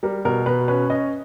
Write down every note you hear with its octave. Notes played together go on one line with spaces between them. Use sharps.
G3 A#4
B2 A#4
B2 B4
C#4 B4
C#4 D#5